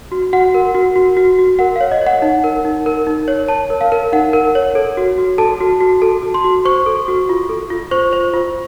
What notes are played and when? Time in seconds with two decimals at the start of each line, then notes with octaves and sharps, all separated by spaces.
0.12 F#4
0.33 F#4 F#5
0.54 A#4
0.75 F#4
0.96 F#4
1.17 F#4
1.39 F#4
1.59 A#4 F#5
1.76 C#5 F5
1.91 D#5
2.01 C#5
2.07 F#5
2.22 D#4
2.44 A#4
2.65 D#4
2.86 A#4
3.07 D#4
3.28 C#5
3.49 C#5 A5
3.70 A#4
3.81 F5
3.92 A#4
4.13 D#4 F#5
4.33 A#4
4.55 C#5
4.75 A4
4.97 F#4
5.18 F#4
5.38 A4 A5
5.60 F#4
5.80 F#4
6.02 A4 A5
6.23 F#4
6.34 C6
6.44 F#4
6.65 C5 C#6
6.86 A4
7.08 F#4
7.29 F4
7.49 A4
7.70 F4
7.91 C5 C#6
8.13 C5
8.34 F4